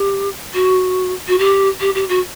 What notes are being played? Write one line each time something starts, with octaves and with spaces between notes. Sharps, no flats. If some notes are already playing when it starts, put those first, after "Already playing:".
Already playing: G4
F#4
F#4
G4
G4
G4
F#4